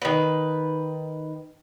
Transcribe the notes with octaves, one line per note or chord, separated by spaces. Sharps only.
D#3 B4